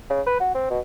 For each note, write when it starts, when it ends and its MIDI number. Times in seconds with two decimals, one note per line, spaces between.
0.10 0.21 49
0.27 0.37 71
0.40 0.52 66
0.55 0.70 60
0.71 0.80 47